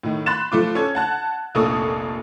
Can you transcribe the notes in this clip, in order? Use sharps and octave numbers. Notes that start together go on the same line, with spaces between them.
A2 D#3
B5 C6 F#6 A6 E7
F3 A3 F4 D6
C#4 A4 G#6
F#5 A5 F#6
F1 A#1 A#3 A4 C#6 D#6